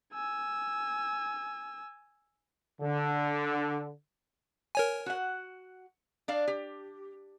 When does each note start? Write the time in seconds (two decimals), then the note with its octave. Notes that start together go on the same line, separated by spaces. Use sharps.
0.13 G#5 E6
2.81 D3
4.75 A#4 C#5 G#5
5.06 F#4 F#5
6.28 D4 D5 F5
6.47 G4